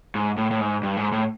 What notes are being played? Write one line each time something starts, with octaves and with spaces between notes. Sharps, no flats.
G#2
A2
A2
G#2
G2
G#2
A2